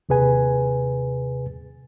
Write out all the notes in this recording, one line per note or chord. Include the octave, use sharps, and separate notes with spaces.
D#2 C3 G#4 B4 G#5